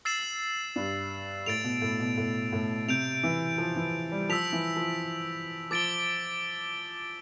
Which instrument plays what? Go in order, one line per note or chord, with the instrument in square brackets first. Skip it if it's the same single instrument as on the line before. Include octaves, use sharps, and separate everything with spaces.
[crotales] E6 A6 C7 E7
[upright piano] G2
[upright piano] A2 [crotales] A6 D7 F7
[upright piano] B2
A2
B2
A2
A2
[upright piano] C3 [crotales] G6 D7 F7
[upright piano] E3
F3
E3
G3
[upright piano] F3 [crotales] E6 B6 F7
[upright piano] E3
F3
[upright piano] F3 [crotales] D6 A6 D7 G7